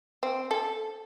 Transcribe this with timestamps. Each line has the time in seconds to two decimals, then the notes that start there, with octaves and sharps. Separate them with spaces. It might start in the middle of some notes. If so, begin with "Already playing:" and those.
0.23 C4
0.51 A4